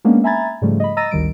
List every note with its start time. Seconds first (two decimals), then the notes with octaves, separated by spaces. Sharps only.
0.05 G#3 A#3 B3 C#4 D4
0.24 E5 G#5 A#5 B5 G#6 A6
0.62 G#2 C#3 F3 G3 A3
0.80 D#5 B5
0.97 D#5 A#5 E6 A6 A#6 D#7
1.11 G#1 D2 D#3 G3 D7